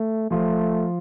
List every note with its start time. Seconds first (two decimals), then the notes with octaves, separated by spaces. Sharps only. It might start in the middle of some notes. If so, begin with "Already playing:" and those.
Already playing: A3
0.31 F3 A3 F4